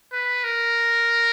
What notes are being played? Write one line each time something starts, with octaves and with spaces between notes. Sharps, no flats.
B4
A#4